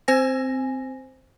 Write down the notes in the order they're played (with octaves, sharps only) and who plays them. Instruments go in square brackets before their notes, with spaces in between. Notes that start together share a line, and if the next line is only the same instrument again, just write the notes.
[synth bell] C4 C5 G#5 A#6